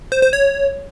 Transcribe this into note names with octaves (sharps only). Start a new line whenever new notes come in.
C5
C5
C#5